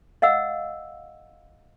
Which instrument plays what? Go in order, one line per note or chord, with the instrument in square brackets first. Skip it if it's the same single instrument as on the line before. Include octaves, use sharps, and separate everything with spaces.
[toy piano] D#5 F5 F#5 E6